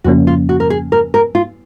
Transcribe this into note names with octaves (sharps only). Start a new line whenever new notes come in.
F2 C#3 F3 A#3 C#4 F#4
F4
F#4
A#4
G#4
A#4
A#4
F4